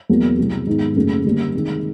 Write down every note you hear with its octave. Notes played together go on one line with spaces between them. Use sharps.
E2 B2 F#3 A#3
C2 B2 F#3
G#2 D#3 G#3 B3 D#4
F#1 F#2 C#3 F#3 A3
D3 G3 A#3
C3 D#3 G#3